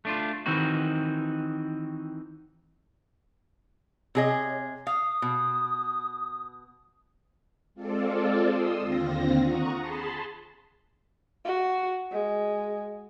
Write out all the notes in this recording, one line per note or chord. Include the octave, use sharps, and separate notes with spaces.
A3 D4 F4
D#3 E3 C4 D#4 F#4
C3 G#4 C#5 D#5
F5 D#6
B2
G#3 C4 F4 A4 D5
C6 D#6 E6
D#2 D3 C4 F4 A#6
F#5 A#5 C#6 D#6
G#4 A5 B5 C6
F#4
G#3